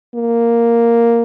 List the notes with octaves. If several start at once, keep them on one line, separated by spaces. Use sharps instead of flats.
A#3